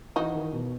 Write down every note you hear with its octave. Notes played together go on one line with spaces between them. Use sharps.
E3 D#4 F#4
D#3
B2